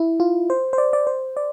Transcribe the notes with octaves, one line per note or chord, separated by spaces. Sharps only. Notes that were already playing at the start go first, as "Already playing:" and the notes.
Already playing: E4
F4
C5
C5
D5
D5
C5
D5